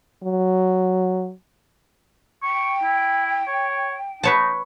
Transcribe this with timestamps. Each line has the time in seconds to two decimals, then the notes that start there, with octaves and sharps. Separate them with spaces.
0.23 F#3
2.42 G5 C#6
2.83 E4
3.47 C#5
4.23 D#4 B4 C#5 A5